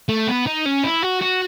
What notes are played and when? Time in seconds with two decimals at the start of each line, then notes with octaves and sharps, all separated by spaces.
0.09 A3
0.28 B3
0.47 D#4
0.66 C#4
0.84 E4
1.03 F#4
1.21 F#4